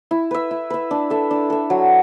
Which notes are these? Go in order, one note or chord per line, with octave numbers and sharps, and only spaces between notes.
E4
B4 E5
E4
B4 E5
D4
A4 E5
D4
A4 E5
F#3